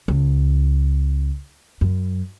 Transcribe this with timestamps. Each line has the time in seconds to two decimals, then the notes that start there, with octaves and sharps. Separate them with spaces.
0.08 C#2
1.81 F#2